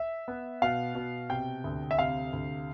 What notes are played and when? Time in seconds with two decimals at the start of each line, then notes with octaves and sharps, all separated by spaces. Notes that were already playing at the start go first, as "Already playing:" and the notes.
Already playing: E5
0.28 B3
0.62 B2 F5
0.95 B2
1.29 C3 G5
1.64 D2
1.91 E5
1.99 C3 F5
2.33 D2